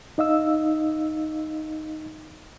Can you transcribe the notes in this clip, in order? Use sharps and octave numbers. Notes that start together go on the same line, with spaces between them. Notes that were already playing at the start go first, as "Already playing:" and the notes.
D#4 D#5 F5 E6